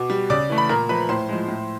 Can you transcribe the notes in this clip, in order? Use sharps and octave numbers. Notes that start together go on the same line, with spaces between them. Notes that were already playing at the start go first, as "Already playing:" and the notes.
Already playing: B2 D6
G3
C#3 D5 D6
E3 A3
B5
A#2 A#4 A#5
F3 A3 B4 B5
A2 C5 C6
F3 G#3
A2